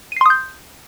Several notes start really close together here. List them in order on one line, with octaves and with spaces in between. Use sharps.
D#7 C7 C6 D#6 G6